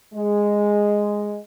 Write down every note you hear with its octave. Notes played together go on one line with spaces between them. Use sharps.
G#3